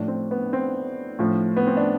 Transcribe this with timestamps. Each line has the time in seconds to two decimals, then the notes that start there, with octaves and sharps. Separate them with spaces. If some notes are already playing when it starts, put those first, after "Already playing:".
Already playing: A2 F3 D4
0.08 C4
0.31 B3
0.53 C4
1.19 A2 F3
1.57 B3
1.67 C4
1.77 D4